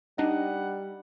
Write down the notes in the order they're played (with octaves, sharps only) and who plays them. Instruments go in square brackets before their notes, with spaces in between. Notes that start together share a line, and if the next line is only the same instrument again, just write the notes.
[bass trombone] G3 [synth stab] D4 D#4 D#5 [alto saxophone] F#5